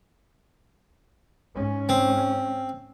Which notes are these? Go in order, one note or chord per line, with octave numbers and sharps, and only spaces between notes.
G#2 C#4
C4